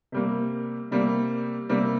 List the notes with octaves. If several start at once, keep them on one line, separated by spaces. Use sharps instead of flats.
C3 G3 A#3
C3 G3 A#3
C3 G3 A#3